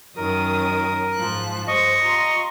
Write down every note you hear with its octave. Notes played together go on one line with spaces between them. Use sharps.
F#2 D#3 A#4 D#6
G#2 F3 F#6
G2 C5 D#5 C#6
F4 A#5 C6